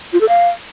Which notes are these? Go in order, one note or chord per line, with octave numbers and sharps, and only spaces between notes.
F4
A4
F5